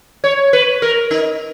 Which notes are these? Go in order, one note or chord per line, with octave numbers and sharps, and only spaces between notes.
C#5
B4
A#4
D#4